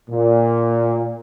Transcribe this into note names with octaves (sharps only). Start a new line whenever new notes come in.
A#2